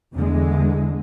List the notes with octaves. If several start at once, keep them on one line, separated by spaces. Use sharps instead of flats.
E2 D3 E3 G#3